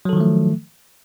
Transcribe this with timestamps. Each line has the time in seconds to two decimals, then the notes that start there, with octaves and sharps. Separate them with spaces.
0.05 F#3
0.09 A4
0.13 D#3
0.17 F3
0.20 A3